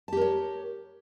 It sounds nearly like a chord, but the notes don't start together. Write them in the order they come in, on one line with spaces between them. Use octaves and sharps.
A5 G4 A#4 C#5